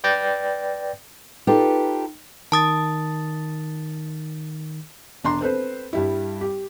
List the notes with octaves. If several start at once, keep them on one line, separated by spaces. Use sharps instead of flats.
B4 D5 G5 G6 A6 A#6
D#4 F4 G4 A4 B4
D#3 A5 D#6 A6
E1 D4 A#5 C6
C4 A4 B4 C5
G2 G3 E4
G4